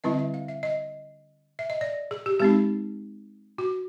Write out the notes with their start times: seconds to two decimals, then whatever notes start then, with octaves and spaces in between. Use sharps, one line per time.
0.04 D3 G3 C4 E4 D#5
0.19 E5
0.34 F5
0.48 E5
0.63 D#5
1.59 E5
1.70 D#5
1.81 D5
2.11 G#4
2.26 G4
2.40 G#3 C4 D#4 G4
3.58 F#4